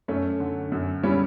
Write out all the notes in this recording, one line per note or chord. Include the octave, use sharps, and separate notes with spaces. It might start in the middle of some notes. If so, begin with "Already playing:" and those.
F#2 A3 C#4
D3
F#2
G3 C#4 E4